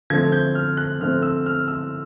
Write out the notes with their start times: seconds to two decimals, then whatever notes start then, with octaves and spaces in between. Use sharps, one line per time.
0.10 D3 F3 A3 C4 G#6
0.32 G6
0.55 F6
0.77 F#6
1.00 D3 F3 A3 C4 F6
1.22 E6
1.46 F6
1.68 E6